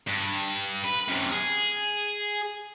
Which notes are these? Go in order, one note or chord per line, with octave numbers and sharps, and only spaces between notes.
G2
B4
F#2 C3
G#4